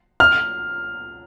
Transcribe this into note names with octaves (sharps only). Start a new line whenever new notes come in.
F6